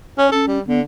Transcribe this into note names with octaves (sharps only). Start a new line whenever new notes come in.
C#4 C#5
C#4 A4
G3
D3 B3